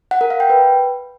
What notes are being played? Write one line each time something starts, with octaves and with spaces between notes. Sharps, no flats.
F#5
A#4
F5
G5
B4